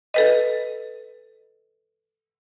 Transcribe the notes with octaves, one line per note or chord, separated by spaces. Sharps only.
A4 B4 D#5